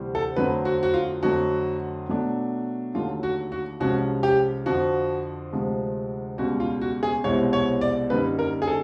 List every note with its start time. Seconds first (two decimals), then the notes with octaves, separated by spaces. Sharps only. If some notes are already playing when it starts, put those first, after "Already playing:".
Already playing: D2 C3 E3 G3 C4
0.15 A4
0.36 F2 D3 F#3 A3 C4 B4
0.65 F#4
0.83 F#4
0.94 F4
1.22 F2 D3 F#3 A3 F#4
2.08 B2 F#3 A3 D4
2.94 D#2 D3 F#3 A3 F4
3.23 F#4
3.52 F#4
3.80 C2 C3 F3 G#3 C#4 F#4
4.23 G4
4.66 F2 D3 F3 F#4
5.53 D2 C3 F3 G#3
6.38 C#2 B2 G3 F#4
6.60 F4
6.81 F#4
7.03 G#4
7.24 C2 B2 G#3 C4 E4 C#5
7.53 C#5
7.81 D5
8.10 F#2 D3 G3 A#3 D#4 B4
8.39 A#4
8.62 G#4
8.67 A4